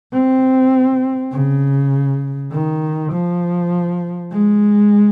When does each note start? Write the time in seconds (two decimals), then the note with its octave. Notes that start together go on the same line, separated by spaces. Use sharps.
0.13 C4
1.32 C#3
2.52 D#3
3.12 F3
4.32 G#3